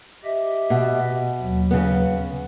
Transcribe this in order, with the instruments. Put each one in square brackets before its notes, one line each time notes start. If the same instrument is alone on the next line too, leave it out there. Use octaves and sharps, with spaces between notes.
[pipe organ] G4 D#5 E5
[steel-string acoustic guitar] B2
[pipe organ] D#2 F#3
[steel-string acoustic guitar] C#3 B3